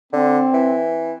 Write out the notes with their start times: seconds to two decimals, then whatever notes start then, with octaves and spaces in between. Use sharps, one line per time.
0.13 D3 C4
0.53 E3